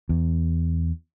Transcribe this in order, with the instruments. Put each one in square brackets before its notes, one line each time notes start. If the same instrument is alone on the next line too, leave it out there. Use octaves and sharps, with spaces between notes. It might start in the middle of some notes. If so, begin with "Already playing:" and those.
[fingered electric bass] E2